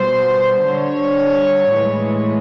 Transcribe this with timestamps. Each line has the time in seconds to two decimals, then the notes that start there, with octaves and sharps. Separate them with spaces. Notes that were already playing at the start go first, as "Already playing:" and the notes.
Already playing: B2 G3 C5
0.65 D3 G3 C#5
1.72 A2 E3 G#3